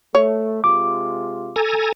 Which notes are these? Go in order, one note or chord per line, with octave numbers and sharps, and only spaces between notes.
A3 C#5
C3 G#3 F4 D6
A4 G#5 A#5